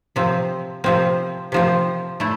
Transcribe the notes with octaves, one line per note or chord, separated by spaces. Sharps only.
C3 F3 C4
C3 F3 C4
C3 F3 C4
A3 E4